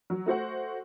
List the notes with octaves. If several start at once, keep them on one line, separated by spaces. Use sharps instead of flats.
F#3
A3 F#4 C5 F#5